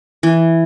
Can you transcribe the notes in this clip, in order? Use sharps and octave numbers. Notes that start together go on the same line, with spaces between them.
E3